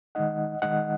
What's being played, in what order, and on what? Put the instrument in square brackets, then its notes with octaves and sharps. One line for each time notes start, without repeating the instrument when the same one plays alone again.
[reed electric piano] D#3 G#3 D#4 D#5 F#5
D#3 G#3 D#4 D#5 F#5